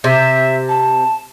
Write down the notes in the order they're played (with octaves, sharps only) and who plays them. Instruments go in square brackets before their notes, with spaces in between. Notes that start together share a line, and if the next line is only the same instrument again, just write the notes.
[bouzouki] C3 [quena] E5
[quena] A5